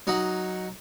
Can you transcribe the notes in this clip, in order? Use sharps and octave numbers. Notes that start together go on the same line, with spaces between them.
F#3 D#4 F#5